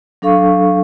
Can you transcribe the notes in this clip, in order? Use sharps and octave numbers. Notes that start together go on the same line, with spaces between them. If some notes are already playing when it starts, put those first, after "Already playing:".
F#3 D4 A4 F5 C#6